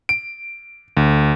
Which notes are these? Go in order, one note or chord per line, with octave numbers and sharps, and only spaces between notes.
D7
D2